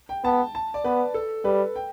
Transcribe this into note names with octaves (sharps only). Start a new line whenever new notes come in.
G5
B3 A5
A5
D5
B3 B4
A4
G3 B4
G5